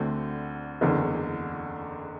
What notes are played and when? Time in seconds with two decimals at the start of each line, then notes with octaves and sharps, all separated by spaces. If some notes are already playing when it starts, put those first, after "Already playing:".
Already playing: D2 D3 A3 C4
0.81 F#1 E2 D3